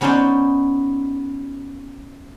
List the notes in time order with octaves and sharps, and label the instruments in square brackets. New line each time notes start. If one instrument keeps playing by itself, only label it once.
[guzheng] F#3 B3 C#4 D#4 C5 D5